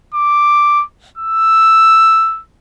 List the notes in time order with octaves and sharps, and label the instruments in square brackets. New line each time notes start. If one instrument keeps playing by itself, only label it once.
[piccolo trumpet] D6
E6